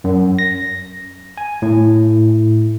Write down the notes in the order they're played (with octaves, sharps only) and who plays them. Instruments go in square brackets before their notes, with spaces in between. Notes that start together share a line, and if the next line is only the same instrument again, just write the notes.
[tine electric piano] F#2
A#6
G#5
A2